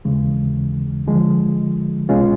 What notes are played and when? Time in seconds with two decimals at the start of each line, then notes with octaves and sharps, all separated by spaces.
0.05 D#2 C#3 E3 G#3
1.06 D3 F3 G#3
2.09 C2 B2 G#3 C#4 F4